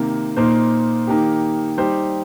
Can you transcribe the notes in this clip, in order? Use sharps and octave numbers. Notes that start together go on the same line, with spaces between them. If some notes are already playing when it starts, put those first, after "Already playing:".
Already playing: C3 D#3 A#3
A#2 A#3 D#4 C5
D#3 A#3 D#4 G4
G3 D#4 G4 C5